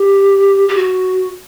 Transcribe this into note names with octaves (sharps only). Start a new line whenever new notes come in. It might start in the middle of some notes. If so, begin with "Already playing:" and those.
Already playing: G4
G4
F#4